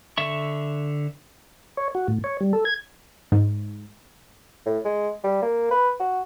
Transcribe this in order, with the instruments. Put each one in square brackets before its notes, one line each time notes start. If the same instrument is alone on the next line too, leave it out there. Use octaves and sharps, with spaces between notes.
[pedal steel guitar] D3 E5 C#6
[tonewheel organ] C#5
F#4
A2
C#5
G3
A4
G#6
[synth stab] G#2
[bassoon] A2
G#3
G3
A#3
B4
F#4